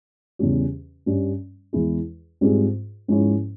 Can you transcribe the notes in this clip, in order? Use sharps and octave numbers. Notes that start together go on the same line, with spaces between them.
E2 C#3 G3 C#4 G4
G2 G3 C#4
E2 E3 G#3 E4 G#4
G#2 G3 C4 F4 G#4
G#2 F3 G#3 C#4 E4